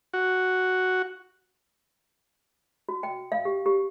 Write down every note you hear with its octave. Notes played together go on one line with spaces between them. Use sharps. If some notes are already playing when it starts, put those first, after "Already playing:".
F#4
F#4
G5
F5
G4
G4